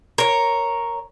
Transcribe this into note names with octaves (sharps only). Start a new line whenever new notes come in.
A#4 C#5